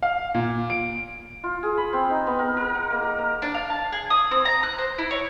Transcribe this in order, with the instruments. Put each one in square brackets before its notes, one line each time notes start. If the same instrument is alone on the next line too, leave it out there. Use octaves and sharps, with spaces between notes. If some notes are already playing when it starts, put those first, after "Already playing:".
[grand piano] F5
A#2
D7
[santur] F4
G#4
B5
C4
D#4
B3
A#4
A#4
F#5
A#3
A#4
A#5
[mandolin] D4
F5
A5
G#4
D#6
C4
A#5
F#6
C5
E4
C#5